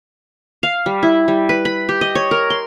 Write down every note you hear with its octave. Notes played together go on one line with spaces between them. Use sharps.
F5
G3
E4
G3
B4
B5
G4
D#5
C#5
A#4
C6